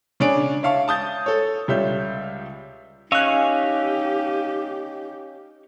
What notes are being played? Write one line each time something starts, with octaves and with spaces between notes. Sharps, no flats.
C#3 D4 C#5 G#5 D7
C#5 E5 F5 A5 C#6
A5 D#6 G6 A6
A4 C#5
C#2 G3 C#5 E5 G6
C#4 D#4 G4 D#5 F5 C#6 E6 F#6